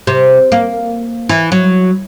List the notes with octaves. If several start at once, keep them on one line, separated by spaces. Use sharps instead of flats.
C3
A#3
E3
F#3